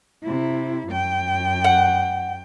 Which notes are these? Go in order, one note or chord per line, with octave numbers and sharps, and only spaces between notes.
C3 E4
F#2 G5
F#5